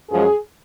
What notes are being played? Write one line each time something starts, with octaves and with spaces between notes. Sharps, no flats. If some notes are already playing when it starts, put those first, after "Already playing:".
F#2 F3 G#3 G#4